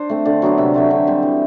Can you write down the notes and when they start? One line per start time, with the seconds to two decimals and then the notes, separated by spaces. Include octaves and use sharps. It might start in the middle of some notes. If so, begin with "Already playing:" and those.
Already playing: D4 C5
0.09 A3 C4
0.25 D3 D5
0.42 F#3 B3 D4
0.58 C3 E5
0.74 F#3 A3 C4
0.91 D3
1.07 G3 C4
1.23 E3